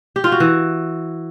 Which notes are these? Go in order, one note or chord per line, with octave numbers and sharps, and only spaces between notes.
G4
F4
F#4
E3